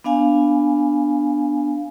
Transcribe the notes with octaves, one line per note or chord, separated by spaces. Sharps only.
B3 D4 F5 G#5